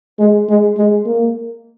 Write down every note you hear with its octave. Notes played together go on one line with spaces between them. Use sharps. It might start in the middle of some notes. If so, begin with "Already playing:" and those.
G#3
G#3
G#3
A#3